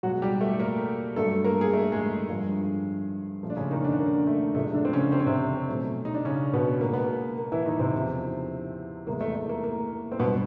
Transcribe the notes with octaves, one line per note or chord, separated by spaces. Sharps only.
B2 F#3 G#3 F#4
G3 G4
A3 A4
A#3 A#4
G2 D3 F#3 A3 A4
A#3 A#4
G#4
A3 A4
G#3 G#4
G2 D3 F3 G#3
A#2 F3 A3
D4
C#3 C#4
D#3 D#4
D3 D4
A#3
A3
C3 F3 G#3 A3
D3 D4
C4
C#3 C#4
C4
C#4
C3 C4
B2 F#3 A3
D#4
D4
C#3 C#4
B2 B3
B2 G#3 A#3
B3
A#3
A#3
E3 E4
D#3 D#4
C3 C4
E2 C#3 F3
E2 C3 E3 G#3 A#3
A3
A3
A#3
A#3
C4
G2 B2 D3 F#3 B3